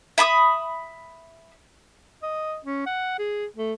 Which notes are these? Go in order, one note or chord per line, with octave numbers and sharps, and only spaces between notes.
E5 B5 D6 D#6
D#5
C#4
F#5
G#4
A3